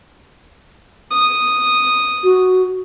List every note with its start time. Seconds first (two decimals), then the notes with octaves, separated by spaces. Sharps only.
1.11 D#6
2.24 F#4